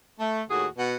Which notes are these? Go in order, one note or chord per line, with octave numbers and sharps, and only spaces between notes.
A3
D#2 A2 F#4 G#4
B2 F#5